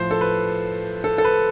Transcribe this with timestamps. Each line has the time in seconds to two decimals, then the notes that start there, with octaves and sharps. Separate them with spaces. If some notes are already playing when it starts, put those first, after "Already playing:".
Already playing: A2 F3 C5
0.11 A4
0.21 B4
1.04 A4
1.18 A4
1.25 B4